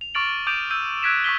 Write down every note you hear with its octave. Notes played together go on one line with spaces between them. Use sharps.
F7
C#6 D6 F6 A6 D7 F#7
D6 D#6 G6 D7 D#7 F7
E6 G6 D#7
E6 F#6 G#6 B6 D7 E7
C#6 D#6 B6 G7